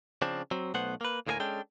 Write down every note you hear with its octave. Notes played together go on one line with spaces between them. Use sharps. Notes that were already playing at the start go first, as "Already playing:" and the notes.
C#3 F3 C4 D4
F#3 C4
B1 A3 B3 C5 F#5
A#3 B4
D2 A2 A#3 G#4 A#4 G#5
G#3 C#4 D4 A4 G5